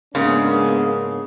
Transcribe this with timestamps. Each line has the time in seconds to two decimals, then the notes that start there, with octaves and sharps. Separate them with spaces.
0.15 G#2 C#3 G#3 A#3 B3 D4 A#4